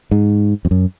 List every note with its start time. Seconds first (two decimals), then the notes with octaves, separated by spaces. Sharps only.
0.11 G#2
0.65 F2
0.71 F#2